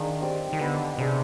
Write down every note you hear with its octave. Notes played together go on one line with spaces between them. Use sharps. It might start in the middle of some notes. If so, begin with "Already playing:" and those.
Already playing: D#3 D4 G#4 F5
C4 D#4 G4 D5
D#3
D3 B3 D#4 B4
C3 D4 G#4 B4